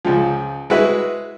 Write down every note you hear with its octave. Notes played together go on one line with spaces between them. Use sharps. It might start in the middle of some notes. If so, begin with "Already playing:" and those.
C#2 F3
G#3 E4 F#4 B4